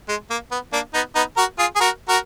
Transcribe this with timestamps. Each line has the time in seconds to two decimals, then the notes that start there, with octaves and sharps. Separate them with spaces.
0.09 G#3
0.30 A#3
0.51 B3
0.73 A#3 D4
0.94 B3 D#4
1.15 B3 D#4
1.37 F#4 A#4
1.59 F4 G#4
1.76 G#4
1.80 F#4 A#4
2.08 F#4 A#4